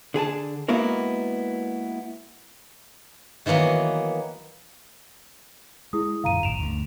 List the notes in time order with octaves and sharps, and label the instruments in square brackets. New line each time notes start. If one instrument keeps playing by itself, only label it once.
[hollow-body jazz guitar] D3 G#4 G#5 A5
G#3 A#3 B3 E4 F#4 A#4
[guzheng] D#3 E3 F#3 A#3 B3
[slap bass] G#3 [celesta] E4 G#4 D#6
[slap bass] F#2 A#2 D3 [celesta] F5 A#5 D#7
[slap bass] E1 A1 G#2 [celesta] D7 E7 F7
[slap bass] D2 G2 D3